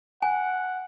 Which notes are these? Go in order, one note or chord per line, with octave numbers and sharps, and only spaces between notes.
F#5 G#5